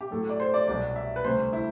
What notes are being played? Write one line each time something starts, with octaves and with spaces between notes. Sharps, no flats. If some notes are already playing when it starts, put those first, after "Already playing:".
G4
A2 F#3 A4
D5
C5
D5
C2 B2 F#3 D5
E5
B4
D2 C3 G3 C5
E4